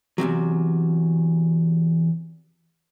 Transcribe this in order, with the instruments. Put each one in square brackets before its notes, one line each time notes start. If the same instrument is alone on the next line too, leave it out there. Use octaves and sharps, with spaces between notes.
[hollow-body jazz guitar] E2 G#2 C3 F#3